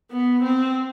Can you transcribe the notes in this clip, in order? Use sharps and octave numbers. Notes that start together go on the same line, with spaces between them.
B3
C4